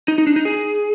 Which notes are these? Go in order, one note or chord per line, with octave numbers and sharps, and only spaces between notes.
D#4
D#4
D4
D#4
G#4